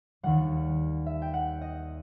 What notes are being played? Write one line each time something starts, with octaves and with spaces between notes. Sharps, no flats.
D#2 D#3 G3 F#5
E5
G5
F#5
D#5